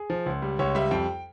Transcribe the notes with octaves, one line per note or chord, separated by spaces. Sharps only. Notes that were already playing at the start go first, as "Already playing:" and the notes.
Already playing: G#4
F3
C#2
G3
C#2 C#5
G3 E5
F2 G5